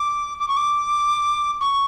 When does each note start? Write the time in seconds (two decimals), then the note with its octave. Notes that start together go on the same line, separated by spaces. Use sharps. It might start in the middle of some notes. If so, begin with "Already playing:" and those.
Already playing: D6
0.39 D6
0.48 C#6
0.56 D6
1.60 C#6